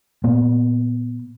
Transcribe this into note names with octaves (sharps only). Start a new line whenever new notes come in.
A#2 A#3 B3